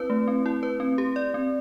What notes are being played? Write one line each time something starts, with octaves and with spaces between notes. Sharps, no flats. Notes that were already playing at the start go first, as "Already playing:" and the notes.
Already playing: C4 E4 B4
A3
C4
E4
B4
C4
G4
D5
C4